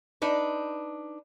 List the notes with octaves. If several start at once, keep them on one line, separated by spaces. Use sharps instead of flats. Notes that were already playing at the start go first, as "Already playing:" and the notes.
D4 D#4 B4